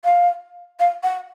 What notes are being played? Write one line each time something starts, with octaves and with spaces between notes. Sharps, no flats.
F5
F5
F#5